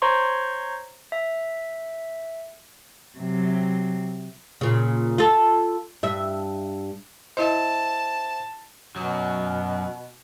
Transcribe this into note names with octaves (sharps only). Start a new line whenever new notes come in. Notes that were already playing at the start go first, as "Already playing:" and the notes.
C5 C#5 A#5 C6 C#6
E5
C3 F#3
A#2 C#3
F4 A4
G2 E5
E4 C5 D#5 E5 A5
F#2 B2 F#3